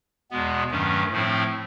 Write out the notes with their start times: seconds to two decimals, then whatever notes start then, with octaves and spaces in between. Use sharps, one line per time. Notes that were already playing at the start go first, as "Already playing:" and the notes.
0.31 E2 B2 G#3 B3
0.71 G2 D#3 F#3 A3 C#4
1.11 A2 F3 A3 C4 E4